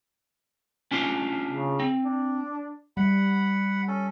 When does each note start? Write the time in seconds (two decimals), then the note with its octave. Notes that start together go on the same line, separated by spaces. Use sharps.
0.91 C#4 D4 F4
1.51 C#3
1.80 C4
2.02 D4
2.97 G3 F#5 B5
3.88 C#4 A4